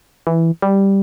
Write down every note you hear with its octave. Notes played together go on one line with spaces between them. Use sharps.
E3
G3